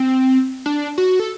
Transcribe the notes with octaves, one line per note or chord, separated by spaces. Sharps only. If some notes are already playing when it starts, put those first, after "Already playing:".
Already playing: C4
D4
F#4
A4